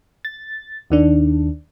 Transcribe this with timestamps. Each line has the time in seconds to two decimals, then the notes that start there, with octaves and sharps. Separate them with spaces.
0.25 A6
0.90 D#2 D#3 D4